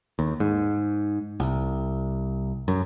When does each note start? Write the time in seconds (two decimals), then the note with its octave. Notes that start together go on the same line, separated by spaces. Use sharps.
0.19 D#2
0.40 G#2
1.40 C2
2.68 F#2